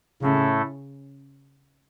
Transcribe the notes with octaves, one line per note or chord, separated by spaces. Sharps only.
A2 C#3 A3 E4 A4